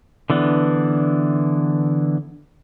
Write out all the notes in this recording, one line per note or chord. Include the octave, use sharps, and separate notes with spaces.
D3 E3 B3 D4